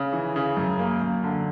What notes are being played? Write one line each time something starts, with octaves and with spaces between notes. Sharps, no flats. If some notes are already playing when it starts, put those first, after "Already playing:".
Already playing: C#3
E3
C#3
F#2
A#3
F#2
D3